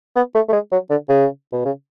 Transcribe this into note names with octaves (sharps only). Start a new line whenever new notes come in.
B3
A3
A3
G#3
F#3
D3
C#3
B2
C#3